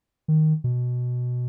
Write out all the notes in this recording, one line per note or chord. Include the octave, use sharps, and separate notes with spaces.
D#3
B2